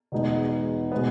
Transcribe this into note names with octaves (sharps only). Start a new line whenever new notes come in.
E2 B2 G#3 B3 D#4
B2 G#3 B3